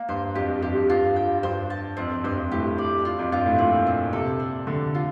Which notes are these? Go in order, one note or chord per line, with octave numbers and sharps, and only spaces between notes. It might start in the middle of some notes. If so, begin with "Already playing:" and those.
Already playing: A#3
G2 C5
F2 G4
G2
F2 G4
F2
G2 F4
G5
G2 C5
A5
F2 C4
F2
G2 C5
G2
A2 G4
D5
F4
F2
G2 F4
A2
A#2 C4
C4
C3 A4
D4
D3 A4
F4